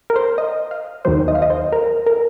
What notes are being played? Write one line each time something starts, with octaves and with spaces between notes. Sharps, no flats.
A#4
C5
D#5
F5
D#2 D#3 F#3 C5
D#5
F5
D#5
C5
A#4
A#4